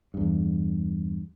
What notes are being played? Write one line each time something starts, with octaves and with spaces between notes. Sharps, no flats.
E2 G2